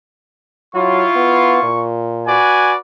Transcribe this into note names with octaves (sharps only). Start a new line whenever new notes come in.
F#3 E4 F4 C#6
B3
A#2
F#4 B4 D5 G#5